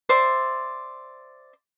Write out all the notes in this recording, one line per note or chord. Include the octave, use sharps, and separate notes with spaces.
C5 D5 E5 D6